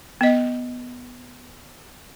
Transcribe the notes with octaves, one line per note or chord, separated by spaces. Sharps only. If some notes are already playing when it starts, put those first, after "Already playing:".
B3 D#5